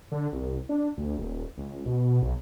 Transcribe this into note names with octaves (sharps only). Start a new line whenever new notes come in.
D3
C2
D4
D2
D#1
C#2
B2
B1